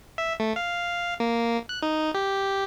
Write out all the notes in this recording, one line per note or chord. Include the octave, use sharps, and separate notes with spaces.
E5
A3
F5
A#3
F#6
D#4
G4